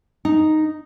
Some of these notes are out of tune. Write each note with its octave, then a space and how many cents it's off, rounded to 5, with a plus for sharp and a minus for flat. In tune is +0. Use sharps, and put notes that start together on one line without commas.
D#4 -5